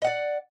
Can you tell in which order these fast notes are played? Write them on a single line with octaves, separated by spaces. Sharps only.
D#5 F#5 D5